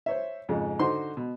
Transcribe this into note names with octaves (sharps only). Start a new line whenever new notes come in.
C5 C#5 E5
F2 G#2 C#3
D3 D#4 F#4 C5 C6
B2